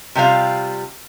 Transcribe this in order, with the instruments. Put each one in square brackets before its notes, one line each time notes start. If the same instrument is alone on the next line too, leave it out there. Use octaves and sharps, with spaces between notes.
[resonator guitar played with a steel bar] C3 G3 F4 F5